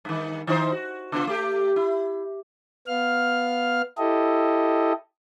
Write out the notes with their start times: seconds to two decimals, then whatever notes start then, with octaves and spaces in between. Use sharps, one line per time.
0.05 G2 D#3
0.47 D#3 D#4 C5
0.72 F#4
1.12 C#3 B3 F4
1.27 A3 G4
1.76 E4
2.87 B3 F5 F6
3.98 E4 G4 A4 D#5